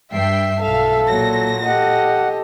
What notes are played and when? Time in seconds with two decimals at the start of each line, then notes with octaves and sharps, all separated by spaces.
0.12 G2 E5 G5 C7
0.62 B1 A4 E5 F5
1.08 A#2 F#3 A#6
1.66 G4 A4 D#5 F#5